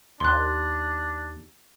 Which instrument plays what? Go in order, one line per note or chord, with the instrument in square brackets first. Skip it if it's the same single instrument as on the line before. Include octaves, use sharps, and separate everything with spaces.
[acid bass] D#2 [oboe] D4 [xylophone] C6 F#6